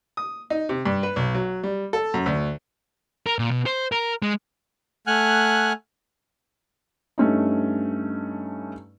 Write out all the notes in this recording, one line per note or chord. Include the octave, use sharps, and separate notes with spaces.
D#6
D#4
C3
G2
B4
B1
F#3
G3
A4
F#2
D2
A#4
A#2
B2
C5
A#4
G#3
A3 F#5 G#5 F6 F#6
G2 A3 C#4 D#4